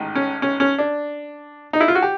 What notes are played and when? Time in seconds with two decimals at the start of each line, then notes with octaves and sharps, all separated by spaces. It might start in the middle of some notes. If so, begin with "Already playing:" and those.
Already playing: A1 G#2 D#3
0.15 C#4
0.42 C#4
0.60 C#4
0.79 D4
1.73 D#4
1.80 E4
1.88 F4
1.95 F#4
2.02 G4